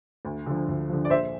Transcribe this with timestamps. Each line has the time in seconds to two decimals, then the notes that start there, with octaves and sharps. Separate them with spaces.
0.25 D2
0.46 D3 F3
0.68 D2
0.89 D3 F3
1.05 D5
1.10 A#1 C5 E5